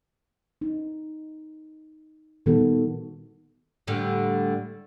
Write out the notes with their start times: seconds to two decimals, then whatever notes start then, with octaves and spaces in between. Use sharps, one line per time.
0.61 D#4
2.46 A#2 D#3 G3 B3 F#4 A4
3.87 A2 D3 G3